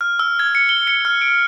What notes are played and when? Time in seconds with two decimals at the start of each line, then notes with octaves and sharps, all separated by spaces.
0.01 F6
0.19 E6
0.39 G#6
0.55 C#7
0.69 G7
0.87 C#7
1.05 F6
1.22 D7